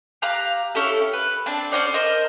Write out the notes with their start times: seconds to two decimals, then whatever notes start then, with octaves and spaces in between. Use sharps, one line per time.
0.22 G4 F5 A#5 F#6
0.75 C#4 E4 G4 A4
1.13 B4
1.46 C4 D4 A5
1.72 C#4 F#4 C5 D5
1.94 A#4 C5 D#5